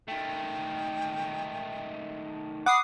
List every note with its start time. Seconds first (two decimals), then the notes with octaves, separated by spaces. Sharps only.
0.08 D#3 A3 G5
2.66 F#5 B5 D6 D#6 C7